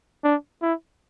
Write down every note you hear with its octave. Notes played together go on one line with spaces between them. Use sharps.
D4
E4